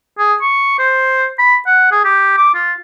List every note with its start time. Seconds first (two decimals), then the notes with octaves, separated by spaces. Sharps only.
0.19 G#4
0.42 C#6
0.79 C5
1.39 B5
1.67 F#5
1.92 G#4
2.04 G4
2.37 D6
2.55 F4